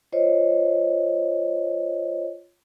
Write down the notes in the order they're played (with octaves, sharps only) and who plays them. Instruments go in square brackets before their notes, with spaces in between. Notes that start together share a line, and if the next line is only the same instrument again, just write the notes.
[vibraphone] F4 C5 C#5 D#5